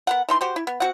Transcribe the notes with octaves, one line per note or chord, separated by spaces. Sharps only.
B3 A#4 F#5
E3 D#4 C6
F#4 G4 C5
E4
B3
C4 F#4 F#5